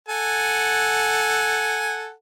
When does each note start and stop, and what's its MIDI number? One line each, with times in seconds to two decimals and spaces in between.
0.09 2.11 69
0.09 2.11 78
0.09 2.11 80